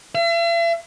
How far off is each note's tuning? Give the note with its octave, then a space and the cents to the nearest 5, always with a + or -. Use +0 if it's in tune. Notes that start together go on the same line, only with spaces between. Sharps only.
E5 +45